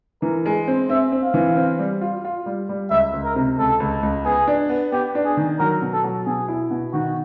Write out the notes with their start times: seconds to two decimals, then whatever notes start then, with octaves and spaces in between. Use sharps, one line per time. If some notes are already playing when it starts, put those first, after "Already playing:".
0.22 E3 A#4
0.46 G#3
0.68 C4
0.90 C4 E5
1.12 C4
1.23 F5
1.34 E3
1.57 C4
1.79 G3
2.01 F4
2.25 F4
2.46 G3
2.69 G3
2.90 C#2 E5
3.13 C#2
3.24 A#4
3.35 C3
3.58 C#2 A4
3.80 C#2
4.03 C#2
4.25 B3 G#4
4.47 D4
4.69 B3
4.92 B3 G4
5.15 D4
5.25 G#4
5.37 D#3
5.59 F#3 A#4
5.82 B2
5.93 A4
6.04 F#3
6.26 B2 G#4
6.48 E4
6.70 B2
6.93 D#3 F#4